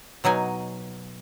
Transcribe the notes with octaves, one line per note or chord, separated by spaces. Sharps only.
B2 F#3 D#4 G#5